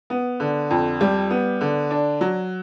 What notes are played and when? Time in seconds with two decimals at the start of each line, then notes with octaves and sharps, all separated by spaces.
0.10 B3
0.40 D3
0.70 F2
1.01 G3
1.30 B3
1.61 D3
1.91 D4
2.21 F#3